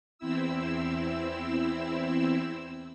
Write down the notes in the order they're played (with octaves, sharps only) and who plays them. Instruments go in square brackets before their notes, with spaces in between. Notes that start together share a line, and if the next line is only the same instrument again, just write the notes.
[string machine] E2 C4 E4 E6